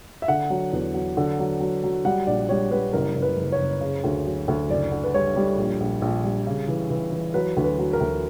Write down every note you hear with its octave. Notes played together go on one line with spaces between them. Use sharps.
E5
D3 F#5
F#3
E2
F#3
D3
F#3
F#3
F#3
G3 F#5
A#1 D5
G3 C#5
G3 B4
F#1 A#4
F#1
B4
F#1
C#5
F#1
C#3
D2
F#3
D2
F#1 D5
D3
B4
G3 C#5
G3
A#1
A#1
A#1
G3
C#3
E3
E3
E3
F#3 B4
D2
B4
F#3
A#4
D2